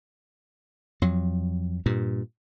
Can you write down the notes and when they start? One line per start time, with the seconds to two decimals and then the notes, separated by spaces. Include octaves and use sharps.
1.02 F2 F#3
1.86 G2 A#2